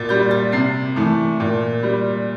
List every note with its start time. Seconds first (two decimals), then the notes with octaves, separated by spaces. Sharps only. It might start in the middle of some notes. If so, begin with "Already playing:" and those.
Already playing: A#2 A6
0.09 G3 G6
0.31 A6
0.52 C3 C7
0.96 E3 A3
1.40 A#2
1.83 G3